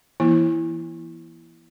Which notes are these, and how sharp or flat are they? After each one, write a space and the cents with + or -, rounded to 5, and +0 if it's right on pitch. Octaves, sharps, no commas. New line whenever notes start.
E3 +20 A#3 +45 E4 +0